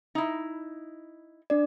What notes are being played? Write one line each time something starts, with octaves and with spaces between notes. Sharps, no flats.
D#4 E4
D4 D5